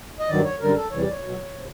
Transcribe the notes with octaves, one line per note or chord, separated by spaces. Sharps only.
D#5
G2 D#3 F#3 D5
C#5
F#2 D3 G3 A#4
A4
E2 C3 E3 G3 C#5
D5
C#5
B2 F#3
C3 F3